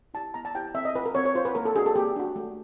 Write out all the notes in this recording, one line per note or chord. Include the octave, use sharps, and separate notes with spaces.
E4 G4 A5
B3 A#5
A5
E4 G4 G5
C4 E5
D#5
F4 B4
A#4
C4 C#5
C#5
F4 C5
B4
A#3 A#4
A4
D4 F#4 G#4
A4
A#3 G4
D4 F#4
A3